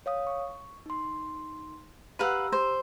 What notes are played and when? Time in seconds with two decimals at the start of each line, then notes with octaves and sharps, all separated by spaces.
0.06 C#5 F5 D#6
0.27 C#6
0.86 D#4 C6
2.19 G4 B4 F5 F#5 A#5 E6
2.52 C5